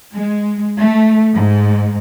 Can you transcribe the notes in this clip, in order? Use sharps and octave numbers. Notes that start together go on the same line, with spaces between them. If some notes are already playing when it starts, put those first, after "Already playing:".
G#3
A3
G#2